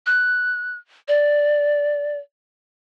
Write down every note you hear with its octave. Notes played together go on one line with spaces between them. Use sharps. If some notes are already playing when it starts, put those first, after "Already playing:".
F#6
D5